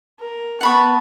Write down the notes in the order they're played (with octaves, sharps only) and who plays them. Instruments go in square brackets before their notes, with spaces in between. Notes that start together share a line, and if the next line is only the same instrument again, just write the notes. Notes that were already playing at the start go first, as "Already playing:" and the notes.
[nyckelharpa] A#4
[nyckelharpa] B3 A5 [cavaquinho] F#5 B5 C#6